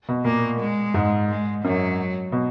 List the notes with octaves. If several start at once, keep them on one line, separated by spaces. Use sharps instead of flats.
B2
A#2 A#3
G#3
G#2
G#3
F#2 F#3
B2